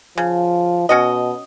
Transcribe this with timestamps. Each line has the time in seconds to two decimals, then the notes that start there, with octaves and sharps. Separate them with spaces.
0.18 C#3 F3
0.89 B2 C#4 F#4 D#5